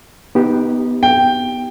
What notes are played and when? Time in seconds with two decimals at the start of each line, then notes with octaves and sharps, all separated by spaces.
0.35 B3 D#4 G4
1.03 G5